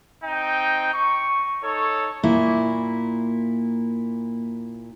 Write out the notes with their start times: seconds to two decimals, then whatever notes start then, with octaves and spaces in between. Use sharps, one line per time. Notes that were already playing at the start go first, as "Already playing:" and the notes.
0.22 C4 D#4 G5
0.93 C#6
1.63 D#4 A4 C#5
2.23 A#2 A#3 E4